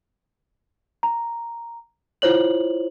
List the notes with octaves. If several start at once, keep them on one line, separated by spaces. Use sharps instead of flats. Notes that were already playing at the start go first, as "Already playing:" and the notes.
A#5
E4 F4 C5 C#5 F#7